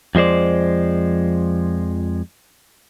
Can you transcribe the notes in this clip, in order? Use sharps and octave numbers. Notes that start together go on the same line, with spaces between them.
F2 F3 G#3 C5 D5